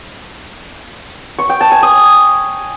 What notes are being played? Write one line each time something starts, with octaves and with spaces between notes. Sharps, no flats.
C#6
G5
A5
G#5
D#6